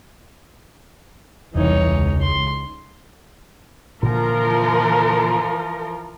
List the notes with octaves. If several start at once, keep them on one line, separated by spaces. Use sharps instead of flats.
E1 C2 E3 D#4 C#5
C#2
C6
A#2 D3 E3 F3 F4 A#4